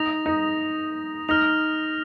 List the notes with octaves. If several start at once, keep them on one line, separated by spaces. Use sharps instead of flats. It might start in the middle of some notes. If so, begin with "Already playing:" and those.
Already playing: D#4 D#6 A#6 F7
D#4
D#4 F6 A#6 F7